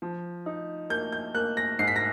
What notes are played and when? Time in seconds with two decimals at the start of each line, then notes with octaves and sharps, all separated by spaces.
0.02 F3
0.46 D#4
0.90 A#3 G6
1.12 G6
1.34 A#3 F#6
1.57 A#6
1.79 G#2 C7
1.88 B6
1.96 A#6